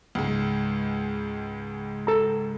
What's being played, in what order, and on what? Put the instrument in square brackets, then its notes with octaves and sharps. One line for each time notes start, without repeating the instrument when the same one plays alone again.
[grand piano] C#2 G#2
[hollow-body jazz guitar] A4 A#5